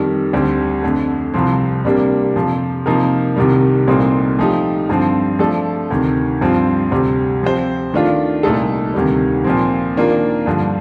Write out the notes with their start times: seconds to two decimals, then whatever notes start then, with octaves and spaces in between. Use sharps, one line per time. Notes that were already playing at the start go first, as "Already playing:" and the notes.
Already playing: F2 D#3 G3
0.33 D2 D3 G3 C4 G4
0.83 F2 D3 A3
1.34 C2 C3 F3 C4
1.85 C3 G3 A#3 D4 G4
2.36 F2 C3 F3
2.86 C3 F3 A#3 D#4 A#4
3.37 C2 C3 D#3 G3
3.88 C2 A#2 A3 C4 D#4
4.39 F3 A3 D#4 G4
4.89 G2 D3 F3 C4
5.39 F3 A3 D4 A4
5.91 D2 C3 D#3
6.41 G2 F3 C4 F4
6.91 D2 C3 G3 C4
7.42 F3 C4 G4 C5
7.93 D#3 A3 D4 F4
8.43 C2 A#2 A3 D#4 A4
8.94 D2 C3 D#3 G3
9.44 A#2 F3 C4
9.96 D#3 A#3 D4 F4 A#4
10.46 G2 D3 F3